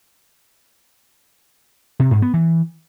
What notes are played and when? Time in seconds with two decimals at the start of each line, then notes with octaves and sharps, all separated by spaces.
1.99 C3
2.11 G#2
2.22 B3
2.34 E3